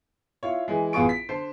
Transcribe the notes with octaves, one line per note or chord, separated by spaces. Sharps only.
E4 F4 C#5
E3 G#3
A1 B3 F4 G#4 C#6 D7
B6
D3 C5 A5 C7